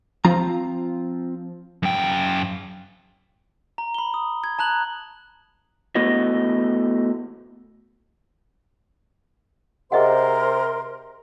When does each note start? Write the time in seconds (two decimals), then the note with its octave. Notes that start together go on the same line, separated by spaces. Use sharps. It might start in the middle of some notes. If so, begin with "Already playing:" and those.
0.25 F3 C4 F4 A#5
1.83 F#2 G5
3.78 A#5
3.94 B5 G7
4.14 D#6
4.44 G#6
4.59 A5 A#5 F#6 F#7
5.95 A3 B3 E4 F#4 D#5
9.92 C3 G#4 A#4 C5 D#5 F#5 C6